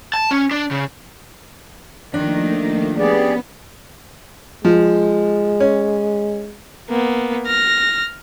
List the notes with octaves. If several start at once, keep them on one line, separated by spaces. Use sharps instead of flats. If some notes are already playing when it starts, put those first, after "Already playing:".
A5
C#4
D4
C#3
D#3 F3 A3 A#3 D4
B3 C#4 G4 G#4 D5
F3 G#3
C#4
A#3 B3
F6 A#6